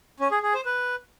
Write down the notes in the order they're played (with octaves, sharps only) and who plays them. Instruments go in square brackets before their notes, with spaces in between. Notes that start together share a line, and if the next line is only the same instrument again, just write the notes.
[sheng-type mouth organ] C#4
G#4
G#4
C5
B4